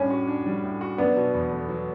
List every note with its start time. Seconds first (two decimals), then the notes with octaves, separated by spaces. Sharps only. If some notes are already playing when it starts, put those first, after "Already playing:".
Already playing: A2 G3 C#4 D4
0.10 F#4
0.27 D4
0.46 G3
0.63 A2
0.81 F#4
0.98 F#3 B3 D4
1.17 B2
1.34 E2
1.51 A3
1.69 F#3